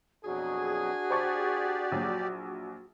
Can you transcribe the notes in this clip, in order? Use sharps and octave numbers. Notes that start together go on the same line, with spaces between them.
F2 B2 F#3 D4 F#4 G#4
G4 C5 D5 A5 C#6
A#1 F#3